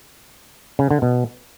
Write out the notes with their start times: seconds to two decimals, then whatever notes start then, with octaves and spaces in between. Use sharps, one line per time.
0.79 C#3
0.91 D3
1.02 B2